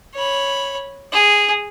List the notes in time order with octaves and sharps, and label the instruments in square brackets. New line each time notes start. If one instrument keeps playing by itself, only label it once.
[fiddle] C#5 B5
G#4